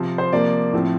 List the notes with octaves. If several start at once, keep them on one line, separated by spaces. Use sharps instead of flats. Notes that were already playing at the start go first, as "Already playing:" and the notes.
Already playing: C3 F3 C4
C5
C3 F3 A#3 D5
A2 F3 A3 C4